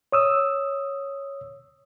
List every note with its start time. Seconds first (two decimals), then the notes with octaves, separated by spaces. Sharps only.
0.12 C#5 D#6 E6